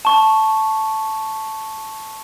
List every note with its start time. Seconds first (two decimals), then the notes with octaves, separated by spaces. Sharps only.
0.05 A5 C#6